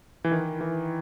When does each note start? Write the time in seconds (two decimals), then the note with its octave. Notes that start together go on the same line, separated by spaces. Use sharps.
0.24 E3
0.31 D#3
0.61 E3